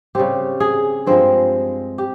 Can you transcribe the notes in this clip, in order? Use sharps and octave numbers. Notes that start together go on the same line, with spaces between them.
C#3 G3 C4 G4
G#4
G2 F3 G#3 C4
G4